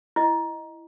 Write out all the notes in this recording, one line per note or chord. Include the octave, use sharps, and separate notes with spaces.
E4 D#5